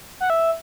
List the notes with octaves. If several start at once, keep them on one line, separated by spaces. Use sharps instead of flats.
F#5
E5